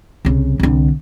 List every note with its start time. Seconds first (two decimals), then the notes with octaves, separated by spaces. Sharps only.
0.25 C2 C#3
0.59 C2 D3